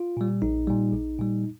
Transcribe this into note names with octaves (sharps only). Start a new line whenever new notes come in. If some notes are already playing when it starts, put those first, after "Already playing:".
Already playing: F4
A#2 G3
A#1 D#4
A#2 G3
A#1
A#2 G3